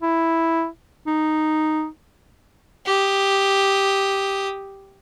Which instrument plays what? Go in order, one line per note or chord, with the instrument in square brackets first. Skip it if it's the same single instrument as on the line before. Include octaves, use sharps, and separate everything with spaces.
[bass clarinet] E4
D#4
[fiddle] G4 D#6